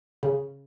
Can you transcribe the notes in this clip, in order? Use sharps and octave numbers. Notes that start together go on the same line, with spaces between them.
C#3